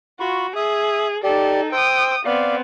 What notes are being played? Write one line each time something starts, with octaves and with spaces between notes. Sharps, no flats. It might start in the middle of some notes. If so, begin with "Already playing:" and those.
F4 F#4 B5 C#6
G#4 E5 D#6
D#4 G4 A4 D5
C5 G5 D#6 E6
B3 C4 D5 F5